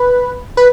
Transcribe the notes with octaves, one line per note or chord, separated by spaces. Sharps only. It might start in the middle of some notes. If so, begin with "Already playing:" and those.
Already playing: B4
B4